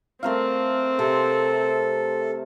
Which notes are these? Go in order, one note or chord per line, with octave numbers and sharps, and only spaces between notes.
A3 C4 A#4 F5
C3 A4